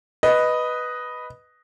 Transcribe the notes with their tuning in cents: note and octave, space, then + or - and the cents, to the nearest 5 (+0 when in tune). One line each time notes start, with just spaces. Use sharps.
B4 +0 D#5 +0